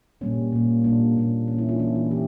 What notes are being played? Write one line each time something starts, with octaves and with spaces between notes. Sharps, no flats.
A#2 G3 A#3 C#4
A#2 G3 A#3
A#2 G3 A#3 D4
A#2 G3 A#3
E3 A#3 C#4
C#4 E4
D4 F4
E3 A#3 C#4 E4
D4 F4
E3 E4 G4